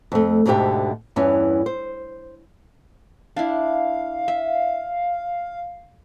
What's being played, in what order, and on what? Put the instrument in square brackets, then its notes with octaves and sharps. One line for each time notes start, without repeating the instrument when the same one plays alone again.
[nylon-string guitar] F2 A3
D2 G#2 B2 D3 G4 E5
E2 G2 E3 C#4
C5
[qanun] D4 E4 [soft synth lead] F5
[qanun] E5